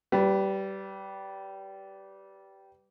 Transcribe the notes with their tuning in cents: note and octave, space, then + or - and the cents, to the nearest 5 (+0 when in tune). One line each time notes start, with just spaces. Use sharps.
G3 -15 B4 +15